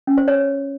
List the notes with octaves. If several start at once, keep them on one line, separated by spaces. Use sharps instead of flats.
C#4
C5
C#5